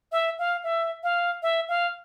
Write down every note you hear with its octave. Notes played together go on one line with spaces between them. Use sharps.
E5
F5
E5
F5
E5
F5